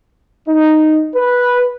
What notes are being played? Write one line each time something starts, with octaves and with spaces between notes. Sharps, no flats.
D#4
B4